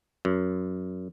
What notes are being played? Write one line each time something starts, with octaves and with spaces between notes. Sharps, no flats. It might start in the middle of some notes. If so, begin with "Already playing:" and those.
F#2